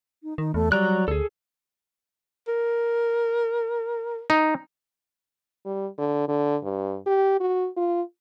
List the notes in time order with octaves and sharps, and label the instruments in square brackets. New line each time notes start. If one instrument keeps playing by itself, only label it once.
[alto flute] D#4
[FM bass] D#3 [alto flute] D#4
[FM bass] E2 [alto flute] A3
[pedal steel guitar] F#3 A#5 F#6 [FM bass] G3 [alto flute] D5
[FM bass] D2 [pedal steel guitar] G#4 A4
[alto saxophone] A#4
[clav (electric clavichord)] D#4
[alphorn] G3
D3
D3
G2
G4
F#4
F4